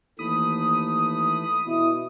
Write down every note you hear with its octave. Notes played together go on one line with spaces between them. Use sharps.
D#2 E3 A3 B5 D#6
B2 E4